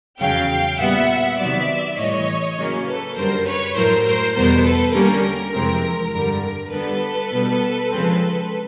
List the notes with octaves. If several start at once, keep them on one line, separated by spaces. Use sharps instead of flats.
E2 C#3 F#3 F5 G5
A#2 G3 B3 E5 F#5
C3 D#3 F#3 B3 D5 E5
A2 E3 G3 C#5 D#5
C#3 F#3 A#3 C#4
A4 B4
F#2 D3 G3 A#4 C5
B4 C#5
A2 F#3 A3 A#4 C5
A#4 C5
E2 B2 G3 B3 A#4 C5
A4 B4
D3 G3 A#3 C#4 A#4
F2 C3 E3 G#3 C4
G2 D3 G3 A#4
A#4
D3 G3 B3 A4 B4
B2 G3 B3
C#3 F3 G#3 C4